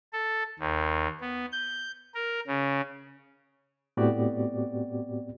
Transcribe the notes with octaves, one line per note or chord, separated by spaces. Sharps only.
A4
D#2
B3
G6
A#4
C#3
A2 B3 C4 F#4 G4 D5